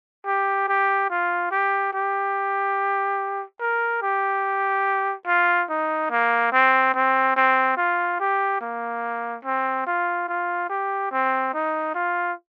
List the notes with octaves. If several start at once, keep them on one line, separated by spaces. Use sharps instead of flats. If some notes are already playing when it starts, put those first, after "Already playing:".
G4
G4
F4
G4
G4
A#4
G4
F4
D#4
A#3
C4
C4
C4
F4
G4
A#3
C4
F4
F4
G4
C4
D#4
F4